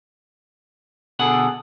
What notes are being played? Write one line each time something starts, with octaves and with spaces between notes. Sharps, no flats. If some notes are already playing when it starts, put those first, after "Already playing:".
B2 D3 G#4 A4 F#5